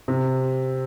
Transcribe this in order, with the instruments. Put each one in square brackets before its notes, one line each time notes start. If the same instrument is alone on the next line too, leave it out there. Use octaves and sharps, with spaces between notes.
[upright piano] C3